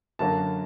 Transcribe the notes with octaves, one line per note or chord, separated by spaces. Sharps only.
F#2 D3 F#3 A#3 A5